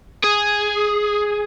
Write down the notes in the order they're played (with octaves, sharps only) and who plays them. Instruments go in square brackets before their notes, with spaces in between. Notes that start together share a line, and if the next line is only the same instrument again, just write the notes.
[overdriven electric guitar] G#4